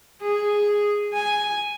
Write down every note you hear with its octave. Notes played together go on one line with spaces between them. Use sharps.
G#4
G#5